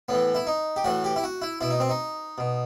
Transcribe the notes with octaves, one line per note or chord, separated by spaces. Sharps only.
A2 E3 B3
E4
D#4
G4
A2 E3 F#4
G4
E4
F#4
E4
B2 E4
D#4
C4
D#4
B2